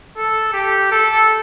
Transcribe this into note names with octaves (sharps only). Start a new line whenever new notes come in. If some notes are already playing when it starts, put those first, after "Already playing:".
A4
G4
A4